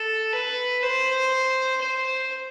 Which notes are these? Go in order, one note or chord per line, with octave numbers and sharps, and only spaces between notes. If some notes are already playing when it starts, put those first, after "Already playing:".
Already playing: A4
B4
C5
C5